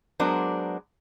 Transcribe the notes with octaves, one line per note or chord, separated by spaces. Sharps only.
F#3 G#3 B3 D4 A#4 C5